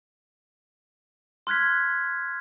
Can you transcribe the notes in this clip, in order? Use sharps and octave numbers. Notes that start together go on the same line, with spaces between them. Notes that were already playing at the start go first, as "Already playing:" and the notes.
C6 F6 F#6 G#6 B6